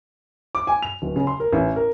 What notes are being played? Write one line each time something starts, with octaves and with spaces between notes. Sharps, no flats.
D6
G#5
F7
D1
C#3
C6
A#4
A1
A#4